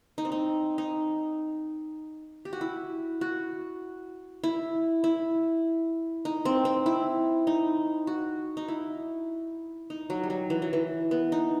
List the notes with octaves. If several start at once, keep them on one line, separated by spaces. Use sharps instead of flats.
D#4
C4
D#4
D#4
G4
F#4
E4
F#4
E4
E4
D#4
C4
C4
E4
D#4
F#4
D#4
E4
D#4
F#3
G3
F#3
E3
F#3
E3
B3
D#4